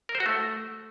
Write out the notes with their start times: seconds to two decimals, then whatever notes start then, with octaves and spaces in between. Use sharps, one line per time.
0.09 A#4
0.15 C5
0.20 F#4
0.26 A3